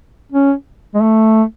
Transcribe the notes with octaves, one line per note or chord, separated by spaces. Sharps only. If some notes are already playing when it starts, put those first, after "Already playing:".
C#4
G#3
A3